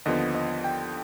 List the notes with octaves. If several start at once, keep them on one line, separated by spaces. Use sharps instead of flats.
D#2 D3 F3 B3 D#5
D#5
G5